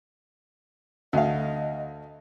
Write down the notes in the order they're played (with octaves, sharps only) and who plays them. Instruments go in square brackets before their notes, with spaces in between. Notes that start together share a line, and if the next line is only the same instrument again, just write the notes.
[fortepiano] D2 F5 [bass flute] D#5